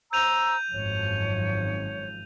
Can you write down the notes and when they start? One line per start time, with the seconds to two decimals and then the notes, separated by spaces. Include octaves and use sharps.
0.13 C5 A#5 E6 G6 D#7 F7
0.72 G#1 F#2 F3 C#5